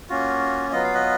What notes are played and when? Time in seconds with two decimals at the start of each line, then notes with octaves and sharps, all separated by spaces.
0.09 A#3 C#4 F4 F#4
0.72 F#3 B3 F4 D#5
0.84 F5
0.94 B4 D#5